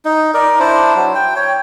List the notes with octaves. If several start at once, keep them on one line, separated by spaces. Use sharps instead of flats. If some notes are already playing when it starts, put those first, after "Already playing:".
D#4
A#4 D5
D4 E4 C5
F#3
G5
C#5 G5